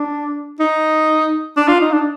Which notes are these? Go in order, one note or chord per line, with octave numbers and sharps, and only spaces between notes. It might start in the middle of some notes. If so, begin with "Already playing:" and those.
Already playing: D4
D#4
D4
F4
D#4
D4